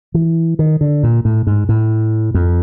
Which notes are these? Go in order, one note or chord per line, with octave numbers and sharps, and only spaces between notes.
E3
D#3
D3
A#2
A2
G#2
A2
F2